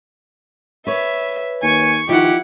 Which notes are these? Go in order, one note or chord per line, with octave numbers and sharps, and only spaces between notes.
B4 C#5 E5
D#2 G#5 C#6
D#3 F3 E4 G4 F#5